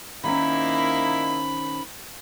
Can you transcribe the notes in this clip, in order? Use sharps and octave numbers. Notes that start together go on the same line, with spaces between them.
D#3 A#3 C4 C#4 D#4 E4 B5